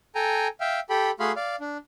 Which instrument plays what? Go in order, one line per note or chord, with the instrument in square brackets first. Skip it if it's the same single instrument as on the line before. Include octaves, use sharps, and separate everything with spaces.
[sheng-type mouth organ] A4 G5 G#5 A#5
E5 F5 G5
G4 A4 G5 B5
A3 F#4 G#4 F5 B5 C6
D5 F5
D4